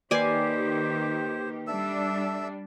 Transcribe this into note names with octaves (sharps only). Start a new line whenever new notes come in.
D#3 A#3 G4 B4 C5 D5 G#5 C7
G3 D4 A4 E5 E6